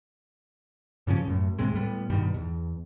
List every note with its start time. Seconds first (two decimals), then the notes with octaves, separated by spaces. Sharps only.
1.07 G2 C#3 F3 C#4
1.27 F#2 A2
1.59 D#2 A2 C3 G#3
1.74 A2 G3 B3
2.10 G2 B2 D#3 G3
2.34 E2